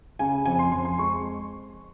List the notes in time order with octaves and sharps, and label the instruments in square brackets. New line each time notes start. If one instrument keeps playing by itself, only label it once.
[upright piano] C#3 G#5
F2 G#5
C6
F2 C6
C6
G#3 C#6